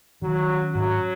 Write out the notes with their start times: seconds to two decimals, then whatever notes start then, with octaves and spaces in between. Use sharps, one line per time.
0.22 D#3 F#3
0.49 C#4
0.74 G#2 F#3